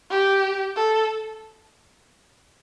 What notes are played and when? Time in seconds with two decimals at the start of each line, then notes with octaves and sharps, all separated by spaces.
0.11 G4
0.77 A4